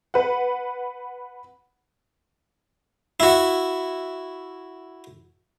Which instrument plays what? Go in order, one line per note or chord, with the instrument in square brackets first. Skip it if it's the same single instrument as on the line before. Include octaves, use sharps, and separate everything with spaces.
[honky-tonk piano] B4 F#5
[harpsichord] E4 F#4